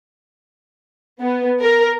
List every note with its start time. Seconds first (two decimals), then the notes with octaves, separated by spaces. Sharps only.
1.20 B3
1.61 A#4